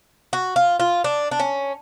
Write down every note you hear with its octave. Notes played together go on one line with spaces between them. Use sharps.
F#4
F4
F4
D4
D4
C#4